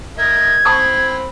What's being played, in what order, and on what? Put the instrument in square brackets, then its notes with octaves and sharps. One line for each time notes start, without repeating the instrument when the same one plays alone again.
[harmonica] A#4 D#5 E5 [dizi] G#6
[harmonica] C4 B5 [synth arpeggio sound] A5 C#6 D#6